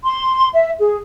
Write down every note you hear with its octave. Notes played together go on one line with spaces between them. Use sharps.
C6
E5
G#4